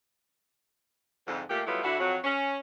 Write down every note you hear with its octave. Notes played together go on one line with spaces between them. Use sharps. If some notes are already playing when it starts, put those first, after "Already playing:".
F2 G#2 D3
A#2 A3 A#3 G4
F#3 G3 A3 B3 E4 F4
D3 E4 F#4
F2 F#3 F#4
C#4